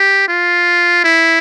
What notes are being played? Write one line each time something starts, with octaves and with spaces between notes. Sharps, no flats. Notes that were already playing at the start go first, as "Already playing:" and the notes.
Already playing: G4
F4
E4